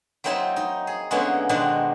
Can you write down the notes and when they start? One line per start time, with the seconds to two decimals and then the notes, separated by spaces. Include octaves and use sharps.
0.24 F#3 A#3 C4 D#4 E4 A5
0.56 D#4
0.87 G#4
1.11 D3 G#3 A#3 B3 C#4 E4
1.49 B2 D#3 G#3 B3 C4 D4